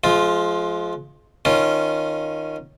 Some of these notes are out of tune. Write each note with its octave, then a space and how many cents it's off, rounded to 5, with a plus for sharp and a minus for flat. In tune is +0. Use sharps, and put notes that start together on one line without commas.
F3 +0 G#3 +35 F4 +0
D#3 +0 C#4 -10 F4 -10